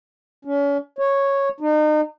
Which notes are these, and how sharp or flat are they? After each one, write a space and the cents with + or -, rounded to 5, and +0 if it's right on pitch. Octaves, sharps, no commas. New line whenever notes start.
C#4 +35
C#5 -5
D#4 -35